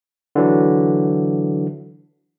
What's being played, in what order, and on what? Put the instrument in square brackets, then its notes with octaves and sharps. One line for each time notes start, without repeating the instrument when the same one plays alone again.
[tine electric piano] D3 E3 F#3